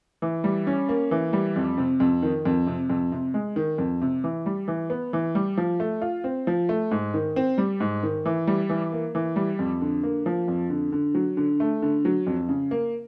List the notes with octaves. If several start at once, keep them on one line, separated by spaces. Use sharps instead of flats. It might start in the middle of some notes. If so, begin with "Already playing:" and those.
E3
G3
C#4
A#3
E3
G3
F2
C3
F2
D#3
F2
C3
F2
C3
G#3
D#3
F2
C3
E3
G3
E3
B3
E3
G3
F3
A3
F4
C4
F3
A3
G#2
D#3
C4
G3
G#2
D#3
E3
G3
E3
A#3
E3
G3
F2
D3
A#3
F3
F2
D3
D3
F#3
D3
A3
D3
F#3
F2
C#3
A#3